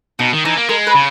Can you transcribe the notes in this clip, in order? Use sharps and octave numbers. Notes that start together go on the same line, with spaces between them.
B2 D#4
D#3
E3 D#4
A#3
G#3 A#4
B4
C#3